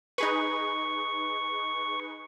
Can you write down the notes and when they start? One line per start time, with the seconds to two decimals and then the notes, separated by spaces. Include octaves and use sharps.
0.18 D#4 G#4 B4 C#6